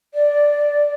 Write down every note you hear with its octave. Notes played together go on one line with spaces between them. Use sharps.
D5